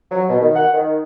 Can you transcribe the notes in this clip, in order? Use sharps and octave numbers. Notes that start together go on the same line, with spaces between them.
F#3
B2
D#3
F#5
D#3